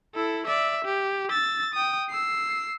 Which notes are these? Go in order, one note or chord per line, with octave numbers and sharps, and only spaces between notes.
E4 A4
D5 E5
G4
E6 A6
G5 D#6
E6 C7